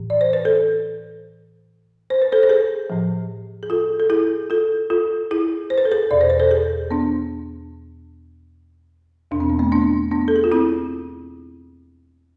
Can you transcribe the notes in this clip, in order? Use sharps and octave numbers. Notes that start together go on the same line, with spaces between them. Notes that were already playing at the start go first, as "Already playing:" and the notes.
Already playing: A2 E3
D5
C5
B4
A4 C5
C5
B4
A4 C5
C5
G#4 B4
A2 F3
G#4
F4 A4
A4
E4 G#4
F4 A4
F4 A4
E4 G#4
C5
B4
A4
G#4 B4
E2 B2 D5
C5
B4
A4 C5
G#4 B4
B3 D4
E2 B2 D4
C4
B3
A3 C4
B3 D4
B3 D4
A4
G#4
F4
C4 E4